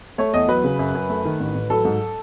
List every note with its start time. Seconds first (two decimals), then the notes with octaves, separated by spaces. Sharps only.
0.18 A3 C#5
0.34 E2 D#5
0.48 F#3 B4
0.64 C#3
0.79 F#2
0.95 F#2
1.10 A3
1.25 D#3
1.40 A1
1.55 A1
1.70 F#3 A4
1.85 G#2